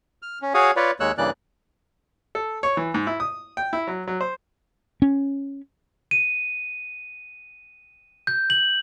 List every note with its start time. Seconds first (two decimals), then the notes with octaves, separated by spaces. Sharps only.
0.22 F6
0.42 C#4
0.54 F#4 G#4 C#5 F5 D#6
0.76 F4 B4 C#5 D5
1.00 D#2 G#3 A#3 C#5 E6 F#6
1.18 G2 C#3 E3 A#3 D5 F#6
2.35 A4
2.63 C#5
2.77 E3
2.94 G#2
3.07 E4
3.20 D#6
3.57 G5
3.73 E4
3.87 F#3
4.07 F#3
4.21 C5
5.02 C#4
6.11 D#7
8.27 G6
8.50 F#7